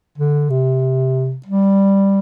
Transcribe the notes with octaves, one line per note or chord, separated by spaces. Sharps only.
D3
C3
G3